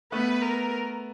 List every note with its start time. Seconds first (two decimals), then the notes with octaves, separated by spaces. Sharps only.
0.12 A3 B3 B4
0.42 A#4